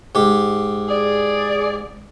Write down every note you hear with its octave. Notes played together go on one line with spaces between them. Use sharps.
G#2 G4
G#4 D5